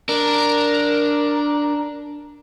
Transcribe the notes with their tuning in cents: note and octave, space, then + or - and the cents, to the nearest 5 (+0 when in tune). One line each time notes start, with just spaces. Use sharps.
D4 +0 A#4 +0